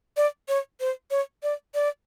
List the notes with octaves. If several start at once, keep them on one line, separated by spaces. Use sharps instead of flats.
D5
C#5
C5
C#5
D5
D5